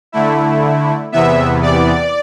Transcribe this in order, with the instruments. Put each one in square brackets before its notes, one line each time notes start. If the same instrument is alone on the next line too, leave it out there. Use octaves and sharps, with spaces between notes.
[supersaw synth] D3 A3 E4
E2 C3 E3 B3 E5
D5